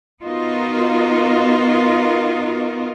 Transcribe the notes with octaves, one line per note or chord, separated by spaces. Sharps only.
B3 D#4 F4 F#4 A#4